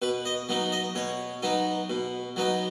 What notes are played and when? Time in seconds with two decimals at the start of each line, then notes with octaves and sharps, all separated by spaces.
0.02 B2 B4
0.25 D#5
0.49 F#3 B3 D#4
0.72 D#5
0.95 B2 C#5
1.42 F#3 B3 D#4
1.90 B2
2.36 F#3 B3 D#4